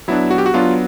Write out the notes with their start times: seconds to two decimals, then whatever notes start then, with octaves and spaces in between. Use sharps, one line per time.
0.08 F#3 B3 D4 E4
0.31 F#4
0.38 G4
0.46 F#4
0.54 F#3 B3 D4 F4